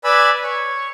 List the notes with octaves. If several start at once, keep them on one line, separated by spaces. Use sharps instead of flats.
B4 D5 G#5 B5 E6
C#5